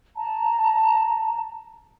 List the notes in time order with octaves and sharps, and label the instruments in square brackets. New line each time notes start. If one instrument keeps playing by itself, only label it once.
[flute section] A5 A#5